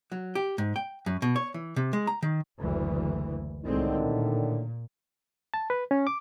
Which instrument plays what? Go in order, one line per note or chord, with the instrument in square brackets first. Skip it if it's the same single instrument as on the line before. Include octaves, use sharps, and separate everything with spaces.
[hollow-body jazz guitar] F#3
G4
G#2
G5
F#2
B2
C#5
E3
C3
G#3
A#5
D#3
[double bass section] F#1 D2 E3
[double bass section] C2 G#3 C4 [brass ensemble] A2 D3 D#3
[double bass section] A#2
[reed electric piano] A5
B4
C#4
D6